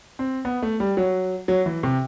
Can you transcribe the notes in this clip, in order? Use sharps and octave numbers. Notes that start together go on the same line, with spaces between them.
C4
B3
A3
G3
F#3
F#3
E3
C3